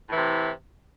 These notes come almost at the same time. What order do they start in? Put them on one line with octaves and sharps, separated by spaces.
A2 E3 C3